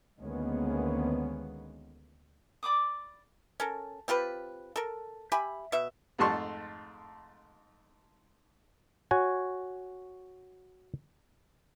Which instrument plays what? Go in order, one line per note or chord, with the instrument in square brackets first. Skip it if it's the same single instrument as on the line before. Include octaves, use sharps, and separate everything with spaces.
[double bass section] D2 D#3 G#3 A#3 B3 C#4
[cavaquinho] D5 B5 D6 D#6
[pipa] C#4 A4 A#4
C4 F4 G4 B4
A4 A#4
G4 E5 G#5 B5
B2 E5
[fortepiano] F2 G#2 A3 A5 C6 C#6
[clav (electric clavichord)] F#4 C#5 G#5